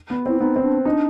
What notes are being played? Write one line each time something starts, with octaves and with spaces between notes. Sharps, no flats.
B3
C4 E4
B3 D#4
C4
D4
D4 D#4